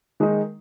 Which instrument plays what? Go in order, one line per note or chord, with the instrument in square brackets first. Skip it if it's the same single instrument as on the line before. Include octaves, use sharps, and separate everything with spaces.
[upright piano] D#3 G#3 D#4